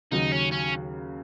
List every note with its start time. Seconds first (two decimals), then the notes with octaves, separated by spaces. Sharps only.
0.12 D#2 C#3 F#3 D#4
0.32 C#4
0.52 C#4